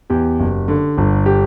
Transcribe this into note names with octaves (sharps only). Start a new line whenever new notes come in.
E2 G4
F#1
D3
G1
G4